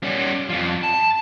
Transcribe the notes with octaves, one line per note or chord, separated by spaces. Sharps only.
G3 C#4
F2 F3
A5